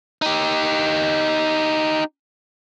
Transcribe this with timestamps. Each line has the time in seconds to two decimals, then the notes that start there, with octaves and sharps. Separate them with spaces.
0.22 D#4 G4